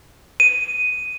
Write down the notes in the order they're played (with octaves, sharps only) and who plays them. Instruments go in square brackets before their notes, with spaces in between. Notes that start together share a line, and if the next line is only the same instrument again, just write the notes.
[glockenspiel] D#7